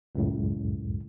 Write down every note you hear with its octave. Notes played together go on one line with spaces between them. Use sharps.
C#2 F#2 A2